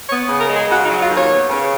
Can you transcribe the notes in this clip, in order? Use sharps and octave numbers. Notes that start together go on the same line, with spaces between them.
B3 C#5
C#3
A#4
G#3 G#4
C#3 F#4
D#4
F#3
F4
D#2 C#5
B3
C#3